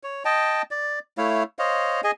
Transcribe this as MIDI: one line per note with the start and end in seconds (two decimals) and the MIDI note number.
0.03 0.23 73
0.25 0.62 75
0.25 0.62 79
0.25 0.62 81
0.71 0.99 74
1.18 1.43 57
1.18 1.43 64
1.18 1.43 73
1.18 1.43 77
1.59 2.01 72
1.59 2.01 73
1.59 2.01 75
1.59 2.01 77
2.04 2.11 68
2.04 2.11 75
2.04 2.11 80